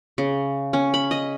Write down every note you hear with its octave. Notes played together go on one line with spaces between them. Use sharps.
C#3
C#4
B5
D#5